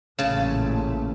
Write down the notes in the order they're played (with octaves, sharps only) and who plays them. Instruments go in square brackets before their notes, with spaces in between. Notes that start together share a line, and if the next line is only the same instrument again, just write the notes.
[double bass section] A1 A#2 A3 [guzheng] C#3 A5